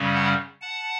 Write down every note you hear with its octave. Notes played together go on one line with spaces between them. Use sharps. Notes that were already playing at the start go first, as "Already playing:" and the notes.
Already playing: F#2 C#3 G3 C#4
F#5 A5
F#5 A5